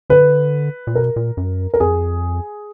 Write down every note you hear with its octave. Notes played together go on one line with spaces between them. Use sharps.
D3 B4
A#2
B2 A#4
A#2
F#2
A#4
F2 G#4